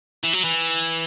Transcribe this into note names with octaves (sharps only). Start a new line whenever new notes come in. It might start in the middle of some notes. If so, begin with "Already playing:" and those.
E3
F#3
E3